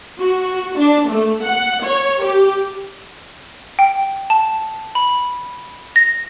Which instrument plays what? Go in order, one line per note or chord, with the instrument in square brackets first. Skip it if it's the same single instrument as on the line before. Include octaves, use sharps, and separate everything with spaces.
[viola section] F#4
D4
A3
F#5
C#5
G4
[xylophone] G5
A5
B5
A#6